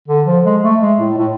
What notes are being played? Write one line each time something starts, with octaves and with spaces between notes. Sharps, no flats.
D3
F3
G#3
A3
G#3
A2
A2